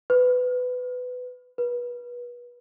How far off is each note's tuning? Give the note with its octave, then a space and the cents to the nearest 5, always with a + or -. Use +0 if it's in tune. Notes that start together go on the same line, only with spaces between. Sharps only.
B4 +15
B4 -25